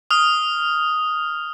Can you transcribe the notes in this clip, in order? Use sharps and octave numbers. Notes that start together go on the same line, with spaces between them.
D#6 F6